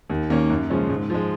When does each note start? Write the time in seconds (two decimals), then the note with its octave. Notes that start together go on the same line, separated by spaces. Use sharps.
0.09 D#2
0.30 D#3 A#3 C#4
0.50 F#2
0.70 C#3 F3 G#3 C#4
0.90 G#2
1.10 F3 G#3